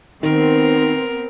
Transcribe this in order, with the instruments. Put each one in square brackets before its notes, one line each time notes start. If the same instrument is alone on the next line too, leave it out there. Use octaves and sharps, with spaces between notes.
[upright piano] D#3 [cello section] B3 C4 [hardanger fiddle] A#4